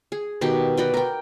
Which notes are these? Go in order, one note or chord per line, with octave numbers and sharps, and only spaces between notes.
G#4
B2 D#3 G4 G5
F#4 B4 D5 G5
A#4 G5